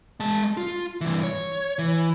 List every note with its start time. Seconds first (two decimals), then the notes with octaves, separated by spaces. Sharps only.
0.20 G#3 A5
0.57 F4
1.01 G2 E3
1.23 C#5
1.79 E3